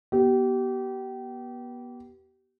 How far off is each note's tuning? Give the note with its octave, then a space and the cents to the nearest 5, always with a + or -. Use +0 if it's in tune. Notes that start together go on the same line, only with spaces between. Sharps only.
B3 -30 G4 -30